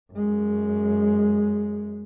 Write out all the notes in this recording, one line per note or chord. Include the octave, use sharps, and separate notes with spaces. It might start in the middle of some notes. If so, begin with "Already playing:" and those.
F#2 G#3